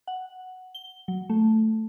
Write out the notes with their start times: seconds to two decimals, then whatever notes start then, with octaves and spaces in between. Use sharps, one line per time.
0.07 F#5
0.75 G7
1.08 F#3
1.30 A3